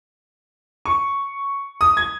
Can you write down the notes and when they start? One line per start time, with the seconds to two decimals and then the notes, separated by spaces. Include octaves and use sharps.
0.86 C#6
1.81 D#6
1.97 G#6